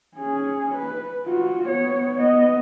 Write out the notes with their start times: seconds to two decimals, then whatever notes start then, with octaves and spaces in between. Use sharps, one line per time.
0.17 C#4 G#4
0.75 B4
1.27 F4 F#4
1.68 B3 C#5
2.17 B3 D#5